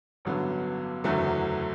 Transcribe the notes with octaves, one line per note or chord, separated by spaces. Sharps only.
A1 G2 D3 F#3 B3
F#1 E2 D3 F#3 A3